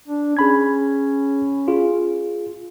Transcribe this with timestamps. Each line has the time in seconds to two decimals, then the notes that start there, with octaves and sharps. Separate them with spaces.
0.08 D4
0.37 C#4 G#4 B5 G#6
1.68 F4 G#4